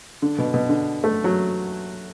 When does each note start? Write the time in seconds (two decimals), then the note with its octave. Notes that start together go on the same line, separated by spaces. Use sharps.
0.22 D3
0.38 B2
0.54 B2
0.69 D3
1.04 A3
1.24 F#3